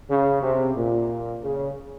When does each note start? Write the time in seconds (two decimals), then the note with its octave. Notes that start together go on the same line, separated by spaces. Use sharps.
0.10 C#3
0.43 C3
0.76 A#2
1.43 C#3